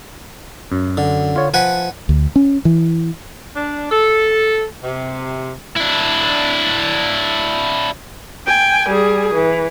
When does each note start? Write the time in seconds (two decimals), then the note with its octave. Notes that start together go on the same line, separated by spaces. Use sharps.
0.72 F#2
0.97 D3
1.36 F4 C#5
1.54 F3 B4 F#5 G#5
2.09 D2
2.36 C#4
2.65 E3
3.56 D4
3.91 A4
4.84 C3
5.76 D4 E4
8.46 G5 G#5
8.89 G3 G#4
9.34 E3